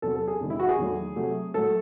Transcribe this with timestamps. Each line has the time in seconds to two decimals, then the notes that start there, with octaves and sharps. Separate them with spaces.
0.02 E2 C3 F#3 A4
0.15 A4
0.28 G#4
0.40 E2 C3 D#3 G#3
0.50 E4
0.59 F#4
0.69 G#4
0.78 E2 D#3 F#3 A3
1.16 C3 F#3 A3
1.54 A2 F#3 A3 A4